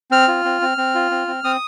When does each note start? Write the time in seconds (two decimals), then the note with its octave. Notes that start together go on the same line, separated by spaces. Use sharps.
0.11 C4 F6
0.28 F4
0.45 C4
0.61 C4
0.78 C4
0.95 F4
1.11 C4
1.27 C4
1.44 C4 D#6